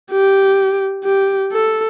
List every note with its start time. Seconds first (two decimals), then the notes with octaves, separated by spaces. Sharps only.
0.12 G4
1.04 G4
1.52 A4